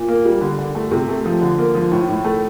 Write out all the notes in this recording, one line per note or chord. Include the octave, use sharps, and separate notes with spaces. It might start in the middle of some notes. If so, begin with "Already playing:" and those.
Already playing: A#2
A#3
G3
D3
D3
A3
C3
A3
F3
D3
A#3
F3
A2
A2
A3